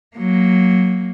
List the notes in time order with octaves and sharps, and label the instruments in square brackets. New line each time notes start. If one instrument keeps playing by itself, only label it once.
[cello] F#3 A#3